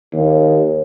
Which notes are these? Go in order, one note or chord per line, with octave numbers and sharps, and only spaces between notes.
D#2